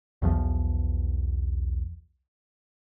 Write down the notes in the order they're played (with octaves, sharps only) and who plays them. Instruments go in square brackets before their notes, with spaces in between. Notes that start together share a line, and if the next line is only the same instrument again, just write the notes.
[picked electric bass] B1 E2 F3